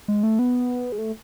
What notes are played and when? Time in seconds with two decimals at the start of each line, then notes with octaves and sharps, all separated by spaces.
0.08 G#3
0.23 A3
0.39 B3
0.92 G#3
0.98 A3